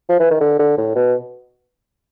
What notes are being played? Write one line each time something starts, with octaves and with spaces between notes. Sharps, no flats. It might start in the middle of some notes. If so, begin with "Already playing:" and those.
F3
E3
D#3
D3
D3
A2
B2